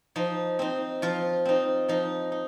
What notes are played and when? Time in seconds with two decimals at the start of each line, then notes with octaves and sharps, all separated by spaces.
0.16 F3 D#4
0.59 C4 D#4
1.02 F3 F4
1.45 C4 D#4
1.89 F3 D#4
2.32 D#4